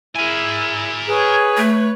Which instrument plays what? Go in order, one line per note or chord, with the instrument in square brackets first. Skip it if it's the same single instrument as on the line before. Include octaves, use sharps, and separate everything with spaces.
[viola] E4 G#4 [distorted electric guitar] A#4 G#5
[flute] G#4 [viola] B4 C#5
[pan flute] A3